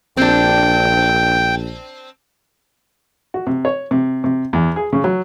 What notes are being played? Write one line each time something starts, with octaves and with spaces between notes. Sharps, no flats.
A#1 C4 D4 G5
F#4
C3
C#5
C3
C3
E2
G#4
C#3
F#3